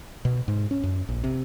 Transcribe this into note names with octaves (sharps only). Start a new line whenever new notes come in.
B2
G#2
C#4
F#2
A#1
C3